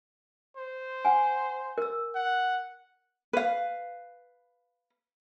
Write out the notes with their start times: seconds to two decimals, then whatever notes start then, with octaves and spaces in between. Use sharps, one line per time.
0.57 C5
1.05 F#5 G#5
1.78 A#4 E6
2.15 F#5
3.33 B4 F5